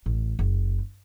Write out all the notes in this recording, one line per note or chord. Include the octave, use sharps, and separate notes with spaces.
A1
F#1